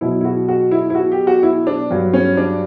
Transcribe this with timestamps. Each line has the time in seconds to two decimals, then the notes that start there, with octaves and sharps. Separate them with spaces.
0.01 B2 F#3 E4
0.21 E4
0.25 F#4
0.49 F#4
0.71 E4
0.90 E4
0.95 F#4
1.12 G4
1.27 F#4
1.43 E4
1.67 D4
1.90 G2 F#3
2.13 C#4
2.37 D4